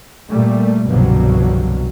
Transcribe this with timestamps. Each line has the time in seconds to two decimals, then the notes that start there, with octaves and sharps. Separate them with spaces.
0.29 A#2 G3 A3
0.87 G1 C2 G2 B2 F3 F#3